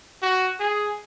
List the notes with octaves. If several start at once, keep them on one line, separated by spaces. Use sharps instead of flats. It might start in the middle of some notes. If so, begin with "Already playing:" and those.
F#4
G#4